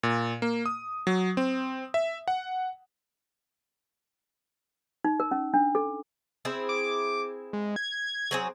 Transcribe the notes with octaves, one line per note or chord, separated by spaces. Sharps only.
A#2
A#3
D#6
F#3
C4
E5
F#5
D#4
A#4
C#4
D4
A4
C4 E4 G#4
D6
G#3
G#6
F#3 C4 G#4